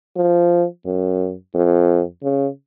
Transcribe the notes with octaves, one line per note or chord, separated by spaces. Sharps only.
F3
F#2
F2
C#3